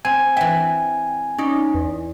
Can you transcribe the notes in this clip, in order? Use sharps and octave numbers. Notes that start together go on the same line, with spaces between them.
C4 G#5
E3 E5 G5
C#4 D#4 D5
E2